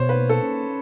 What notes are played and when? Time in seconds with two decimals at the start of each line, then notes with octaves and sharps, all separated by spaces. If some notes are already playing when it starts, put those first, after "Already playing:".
Already playing: B2 C5 C#5
0.09 B4
0.16 A#3
0.29 A4
0.43 C#4